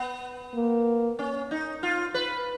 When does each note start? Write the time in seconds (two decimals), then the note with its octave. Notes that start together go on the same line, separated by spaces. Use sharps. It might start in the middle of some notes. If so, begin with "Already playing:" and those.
Already playing: B3
0.55 A#3
1.19 C#4
1.51 D#4
1.83 F4
2.14 B4